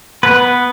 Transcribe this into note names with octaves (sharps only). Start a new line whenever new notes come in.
B3 B4